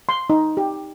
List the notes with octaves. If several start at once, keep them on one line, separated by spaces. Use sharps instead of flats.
C6
D#4
G4